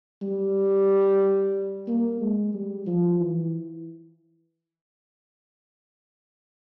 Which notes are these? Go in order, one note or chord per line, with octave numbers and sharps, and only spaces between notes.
G3
A#3
G#3
G3
F3
E3